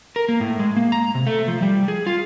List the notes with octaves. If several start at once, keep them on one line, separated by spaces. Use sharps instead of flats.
A#4
A#3
A2
G#3
A#3
A#5
C3
A3
F3
G3
G#4
F4